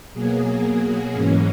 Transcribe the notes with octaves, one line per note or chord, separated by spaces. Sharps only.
B2 F#3 A#3 G#4
G#2 E3 A#3 C#4